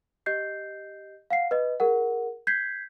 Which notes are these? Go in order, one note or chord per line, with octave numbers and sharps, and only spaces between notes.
G4 D#5 G6 C7
F5 F#5 C7
B4 D#5
G#4 A#4 F#5
G6 G#6 B6 C7